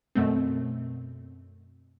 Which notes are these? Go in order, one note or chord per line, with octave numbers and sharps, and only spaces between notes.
F#2 B2 A3 C4